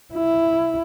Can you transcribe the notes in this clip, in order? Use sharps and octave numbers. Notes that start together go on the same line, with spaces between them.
E4